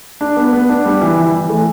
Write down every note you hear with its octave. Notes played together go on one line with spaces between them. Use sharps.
D4
B3
B3
D4
G3
E3
E3
E3
A3